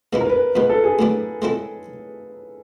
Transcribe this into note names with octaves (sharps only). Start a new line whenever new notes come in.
B2 G#3 C#4 E4 B4
A#4
B4
B2 G#3 B3 B4
A4
G#4
A2 F#3 B3 D4
G#3 C4 E4 A4